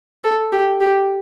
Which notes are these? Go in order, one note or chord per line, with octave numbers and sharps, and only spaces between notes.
A4
G4
G4